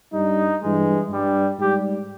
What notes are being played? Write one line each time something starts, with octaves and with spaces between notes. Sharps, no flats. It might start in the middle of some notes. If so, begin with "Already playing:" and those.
G2 G3 D#4
G2 E3 G#3
G2 G3
G#2 G3 G4